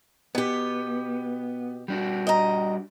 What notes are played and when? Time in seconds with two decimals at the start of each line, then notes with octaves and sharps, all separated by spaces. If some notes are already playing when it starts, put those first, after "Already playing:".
0.35 B2 B3 G4
1.88 G3 D4 F#4
2.27 D#5 A#5